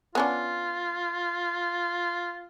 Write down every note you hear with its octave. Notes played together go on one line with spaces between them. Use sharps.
B3 C#4 D4 F4